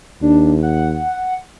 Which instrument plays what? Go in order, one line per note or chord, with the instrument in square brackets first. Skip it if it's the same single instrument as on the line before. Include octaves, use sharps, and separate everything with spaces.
[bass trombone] D#2 [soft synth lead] D4
[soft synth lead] F#5